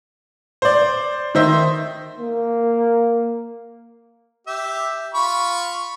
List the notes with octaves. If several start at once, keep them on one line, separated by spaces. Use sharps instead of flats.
C5 D5
D#3 D#4 C5 E5 C6
A#3
G4 E5
F4 B5 C#6